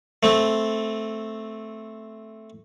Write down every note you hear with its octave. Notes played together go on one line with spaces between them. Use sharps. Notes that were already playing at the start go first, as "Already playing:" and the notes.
A3 C4